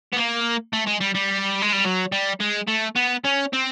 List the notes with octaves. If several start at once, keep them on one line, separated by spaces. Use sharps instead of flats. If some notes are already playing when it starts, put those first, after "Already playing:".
B3
A#3
A3
G#3
G3
G3
G#3
G3
F#3
G3
G#3
A3
B3
C#4
C4